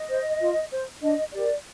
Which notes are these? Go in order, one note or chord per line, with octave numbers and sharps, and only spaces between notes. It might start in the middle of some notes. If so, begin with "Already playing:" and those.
Already playing: D#5
C5
F4
C5
D4 D#5
G4 A#4 D5